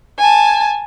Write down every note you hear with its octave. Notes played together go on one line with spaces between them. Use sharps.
G#5 A5